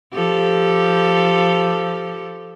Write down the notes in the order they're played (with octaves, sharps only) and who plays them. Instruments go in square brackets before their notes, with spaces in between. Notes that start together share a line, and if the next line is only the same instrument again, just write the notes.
[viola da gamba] F3 G4 A4